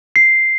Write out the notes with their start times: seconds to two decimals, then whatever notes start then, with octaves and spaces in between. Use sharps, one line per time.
0.16 C7